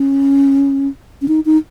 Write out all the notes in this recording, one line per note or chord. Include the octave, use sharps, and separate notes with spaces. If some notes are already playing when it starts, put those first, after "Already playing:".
Already playing: C#4
C#4
D#4
D#4